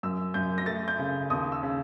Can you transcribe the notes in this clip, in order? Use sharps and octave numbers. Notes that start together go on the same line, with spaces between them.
F#2 E6
F#2 G6
A#6
A3 A6
G6
C#3
D#2 D#6
E6
C#3